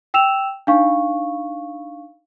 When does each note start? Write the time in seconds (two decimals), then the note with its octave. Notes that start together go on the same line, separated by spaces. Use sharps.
0.14 G5 E6 E7 F7
0.67 D4 D#4 F5 C#6